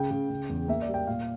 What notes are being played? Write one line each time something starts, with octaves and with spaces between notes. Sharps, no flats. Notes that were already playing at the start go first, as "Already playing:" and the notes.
Already playing: C#3 G5
C#3
C#3
E2
A#3 E5
D5
G3
G5
A#2 F5